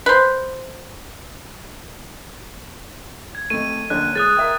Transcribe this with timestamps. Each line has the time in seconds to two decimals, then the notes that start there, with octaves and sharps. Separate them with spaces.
0.06 B4 C5
3.35 G#6
3.50 F2 A3 D#7
3.90 A#1 D3 C#4 F#6
4.15 G#3 D#6 F#6 A6
4.37 A#4 E5 G5